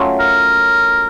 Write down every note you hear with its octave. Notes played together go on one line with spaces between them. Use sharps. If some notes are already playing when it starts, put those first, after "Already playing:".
Already playing: F#3 A3 C#4 F4
A#4